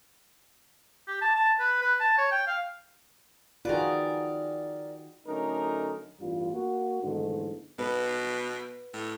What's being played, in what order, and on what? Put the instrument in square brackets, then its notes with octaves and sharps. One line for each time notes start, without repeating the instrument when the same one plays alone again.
[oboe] G4
A5
A5
B4
B4
A5
C#5
G5
F5
[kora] D#3 B4 [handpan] F4 F#4 G#4 [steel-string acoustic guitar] A#4 D5
[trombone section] D3 F#3 A3 C#4 D#4 A#4
A1 E2 G2 G3 F4
A#3 F#4
B1 E2 G#2 D3 D#3 A3
[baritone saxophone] B2 [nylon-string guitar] B4
[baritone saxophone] A2